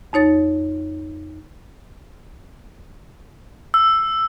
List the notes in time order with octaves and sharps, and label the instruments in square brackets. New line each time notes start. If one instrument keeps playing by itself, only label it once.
[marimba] F2 D#4 C#5 A6
[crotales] E6